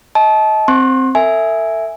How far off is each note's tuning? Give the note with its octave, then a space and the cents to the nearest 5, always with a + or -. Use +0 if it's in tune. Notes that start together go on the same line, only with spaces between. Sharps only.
D#5 +30 A5 -25
C4 +0 C6 +25
A4 +40 E5 +0 G#5 +0